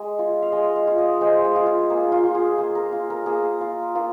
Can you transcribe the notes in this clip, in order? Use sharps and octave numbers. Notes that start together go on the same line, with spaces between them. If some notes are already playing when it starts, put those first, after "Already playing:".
Already playing: G#3
F4
F5
G#3 D#5
F5
F4
D#5
G#3 C5
G#4
F4
F4
A#3 G#4
F4
F4
G#4
A#3 G#4
A#4
F4
A#4
A#3 G#4
F4
A#3 F4